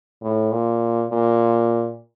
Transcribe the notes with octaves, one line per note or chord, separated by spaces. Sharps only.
A2
A#2
A#2